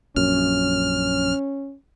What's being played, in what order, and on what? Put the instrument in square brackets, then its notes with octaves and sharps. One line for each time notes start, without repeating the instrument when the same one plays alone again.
[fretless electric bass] A#1 F#2 [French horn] C#4 [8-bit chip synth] F6